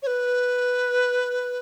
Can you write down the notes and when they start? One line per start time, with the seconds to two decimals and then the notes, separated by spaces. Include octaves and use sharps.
0.02 C#5
0.07 B4